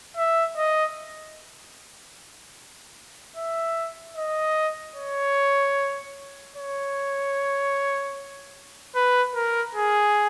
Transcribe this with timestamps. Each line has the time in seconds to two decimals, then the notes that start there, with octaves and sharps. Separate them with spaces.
0.17 E5
0.57 D#5
3.36 E5
4.16 D#5
4.96 C#5
6.56 C#5
8.95 B4
9.35 A#4
9.75 G#4